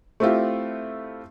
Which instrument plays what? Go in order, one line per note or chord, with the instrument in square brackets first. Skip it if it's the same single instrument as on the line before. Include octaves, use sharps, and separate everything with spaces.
[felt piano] A3 C4 E4 F4 G4